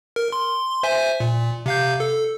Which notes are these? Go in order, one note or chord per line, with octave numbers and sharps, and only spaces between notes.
A#4
C6
C5 E5 G#5
A#2
C3 F5 G6
A4